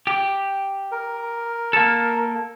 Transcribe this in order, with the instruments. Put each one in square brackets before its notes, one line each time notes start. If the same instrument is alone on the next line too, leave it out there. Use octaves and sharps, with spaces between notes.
[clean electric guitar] G4
[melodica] A#4
[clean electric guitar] A#3 A4